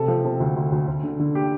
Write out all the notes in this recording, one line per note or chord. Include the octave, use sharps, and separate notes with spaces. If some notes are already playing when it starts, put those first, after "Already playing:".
Already playing: C3 A4
F3
C3
D2
D2
D2
D2
D3
D3
G4